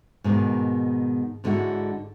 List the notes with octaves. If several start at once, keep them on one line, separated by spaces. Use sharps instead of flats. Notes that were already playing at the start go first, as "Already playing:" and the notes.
G#2 B2 D#3
G#2 D3 G#3 E4 F#4